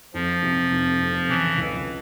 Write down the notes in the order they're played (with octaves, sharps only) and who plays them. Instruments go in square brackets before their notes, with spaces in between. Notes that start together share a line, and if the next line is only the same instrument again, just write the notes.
[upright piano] F2 [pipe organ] F3
[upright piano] C3
F1
F2
[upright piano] C#3 [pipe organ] E3
[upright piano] C#2